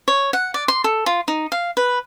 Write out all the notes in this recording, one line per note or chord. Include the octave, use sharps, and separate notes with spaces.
C#5
F#5
D5
C6
A4
F4
D#4
F5
B4